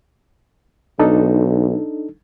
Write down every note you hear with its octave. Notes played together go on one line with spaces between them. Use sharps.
B1 D4 D#4 A4